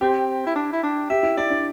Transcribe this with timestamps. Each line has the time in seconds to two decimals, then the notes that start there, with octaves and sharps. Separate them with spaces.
0.01 C4 G4
0.47 E4
0.55 D4
0.72 E4
0.83 D4
1.10 G4 E5
1.23 E4
1.37 E4 D5
1.50 D4